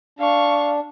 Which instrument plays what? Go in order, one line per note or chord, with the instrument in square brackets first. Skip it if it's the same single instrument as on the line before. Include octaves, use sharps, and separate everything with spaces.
[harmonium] D4 [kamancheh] F5 C#6